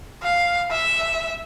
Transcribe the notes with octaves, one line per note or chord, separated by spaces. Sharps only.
F5
E5